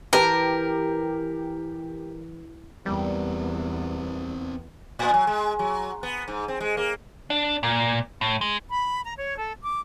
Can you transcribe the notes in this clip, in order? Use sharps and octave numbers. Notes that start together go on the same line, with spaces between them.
E3 G4 A#4 B4 A5
E2 G3 B3 C4 A#4
A2
F#3
G#3
F#3
B3
G#2
C4
G#3
A#3
D4
A#2
A2
G#3
B5
A#5
C#5
A4
D6